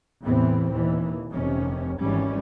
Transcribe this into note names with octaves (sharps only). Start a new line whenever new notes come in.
E2 A2 C3 E3 B3 C4
D#2 A#2 E3
F1 C3 D#3 C#4
G#1 G#2 E3 G3 C#4